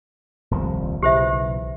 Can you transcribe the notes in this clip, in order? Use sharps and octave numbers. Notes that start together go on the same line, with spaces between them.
D#1 C2 F3
B1 C#3 E3 G4 C5 E5